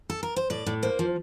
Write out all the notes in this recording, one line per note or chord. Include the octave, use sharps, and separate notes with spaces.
A4
A#4
C5
A2 D5
A2
A#3 C5
F3